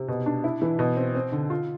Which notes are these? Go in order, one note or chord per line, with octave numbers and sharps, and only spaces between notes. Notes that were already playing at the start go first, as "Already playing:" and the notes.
Already playing: C3
B2
D4
E4
E3
B2
C4
C4
D3
F4